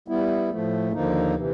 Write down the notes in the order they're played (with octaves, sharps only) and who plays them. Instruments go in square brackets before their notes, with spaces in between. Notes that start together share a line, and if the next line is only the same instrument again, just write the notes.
[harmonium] G3 B3 E4
A2 F3 A3
D#2 D3 F3 A#3 D#4
C3 E3